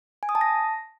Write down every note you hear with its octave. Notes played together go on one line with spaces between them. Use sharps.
G#5
D#6
A5
A#6